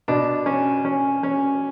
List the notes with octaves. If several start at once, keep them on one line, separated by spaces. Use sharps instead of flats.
B2 D4
C#4
C#4
C#4